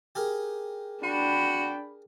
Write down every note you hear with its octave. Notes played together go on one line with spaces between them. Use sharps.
G4 G#4 A#4
D4 F#4 G5 B5